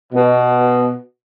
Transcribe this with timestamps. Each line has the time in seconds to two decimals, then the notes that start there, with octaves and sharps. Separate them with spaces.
0.13 B2